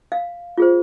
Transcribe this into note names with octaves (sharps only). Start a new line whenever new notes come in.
F5
F4 G#4 C5